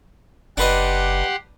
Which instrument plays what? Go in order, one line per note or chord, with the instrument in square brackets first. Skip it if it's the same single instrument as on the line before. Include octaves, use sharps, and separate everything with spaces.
[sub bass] F#1 [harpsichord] D4 B4 D#5 [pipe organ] G4 F#5 C6